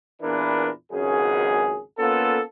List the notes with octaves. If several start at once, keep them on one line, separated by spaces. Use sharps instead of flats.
E2 A#2 E3 D4 A#4 B4
G#1 C#2 F#2 C#4 G#4
A#3 B3 C#4 F4 A4